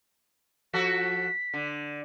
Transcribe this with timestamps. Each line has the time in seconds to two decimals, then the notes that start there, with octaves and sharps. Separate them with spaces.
0.74 F3 F#4 A4 B6
1.54 D3